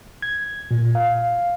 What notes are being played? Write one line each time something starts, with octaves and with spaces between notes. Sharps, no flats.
G#6
A#2
F5